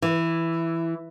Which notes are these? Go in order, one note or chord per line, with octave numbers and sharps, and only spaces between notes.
E3